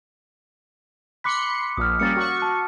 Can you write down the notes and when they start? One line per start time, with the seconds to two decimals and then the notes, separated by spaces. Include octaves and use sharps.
1.24 B5 C6 D6 F#6 B6 C#7
1.77 A#1 D#6 F6
1.99 G3 A#3 C#4 A6 C#7
2.16 F#4 C#6 A6
2.42 A5